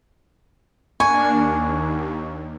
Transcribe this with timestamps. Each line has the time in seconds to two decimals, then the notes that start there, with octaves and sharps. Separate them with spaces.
1.00 A#3 D4 G#5 C#6
1.29 D#2